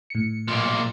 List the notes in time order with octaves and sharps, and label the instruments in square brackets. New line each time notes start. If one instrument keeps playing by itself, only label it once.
[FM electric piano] A2 C#7
[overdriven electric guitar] B1 A#2